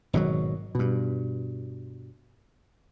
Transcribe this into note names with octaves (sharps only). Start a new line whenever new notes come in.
G#1 B2 D3 F#3
G2 B2